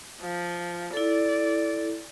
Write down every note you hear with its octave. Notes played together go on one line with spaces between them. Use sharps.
F3
E4 A4 D5